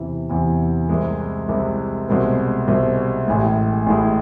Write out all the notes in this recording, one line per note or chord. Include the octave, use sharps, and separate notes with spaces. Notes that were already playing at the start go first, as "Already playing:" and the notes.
Already playing: E2 C3 E3
E2 C3 E3
C2 C3 G#3
C2 C3 G#3
C2 B2 G#3 C4
C2 B2 G#3 C4
A1 A2 G#3
A1 A2 G#3